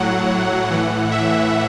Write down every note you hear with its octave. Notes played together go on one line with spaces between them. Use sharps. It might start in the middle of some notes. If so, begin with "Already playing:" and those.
Already playing: A2 F#3 F#5
A2 E3 F#5
E5